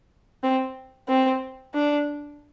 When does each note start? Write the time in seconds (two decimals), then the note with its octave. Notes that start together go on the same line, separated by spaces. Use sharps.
0.43 C4
1.08 C4
1.75 D4